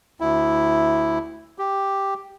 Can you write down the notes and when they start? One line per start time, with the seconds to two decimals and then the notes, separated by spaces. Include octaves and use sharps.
0.20 D2 E4
1.58 G4